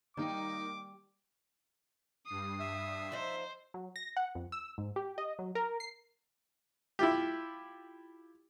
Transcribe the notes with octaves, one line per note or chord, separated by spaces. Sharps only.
D#3 G3 A#3 D#4 D6
G2 D#6 C7
E5
F3 D4 D#4 C5
F#3
A#6
F#5
F2
E6
G#2
G4
D#5
F#3
A#4
C7
E4 F4 G4